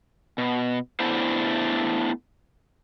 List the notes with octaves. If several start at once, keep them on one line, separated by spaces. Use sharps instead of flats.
B2
A3 B3 D4 E4 C5